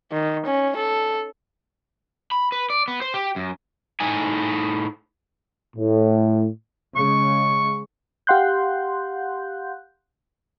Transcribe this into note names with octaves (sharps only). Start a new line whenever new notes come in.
D#3
C#4
A4
B5
B4
D5
B3
C5
G4
F#2
A2 D#4 G#5
A2
C#3 G#3 C#6
G4 F5 F#5 C6 F#6 G6